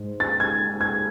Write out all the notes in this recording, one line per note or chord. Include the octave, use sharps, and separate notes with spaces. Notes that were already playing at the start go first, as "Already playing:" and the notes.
Already playing: G#2
A6
G#6
G#6